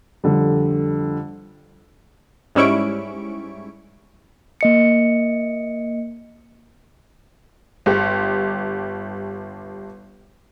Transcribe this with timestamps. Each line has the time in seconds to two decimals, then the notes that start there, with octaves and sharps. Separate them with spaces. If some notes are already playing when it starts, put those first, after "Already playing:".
0.24 F2 D3 G3
2.55 G#2 G3 C#4 E4 C#6 D7
4.61 A#3 D#5 C#7
7.86 G1 G4